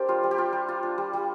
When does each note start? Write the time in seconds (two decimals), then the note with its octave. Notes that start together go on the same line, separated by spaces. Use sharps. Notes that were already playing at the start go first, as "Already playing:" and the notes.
Already playing: C4 D4 G4 A#4 C5
0.08 G3 F4
0.23 G3
0.31 G4
0.38 F4
0.53 G3
0.68 F4
0.83 D4
0.98 G3
1.13 G3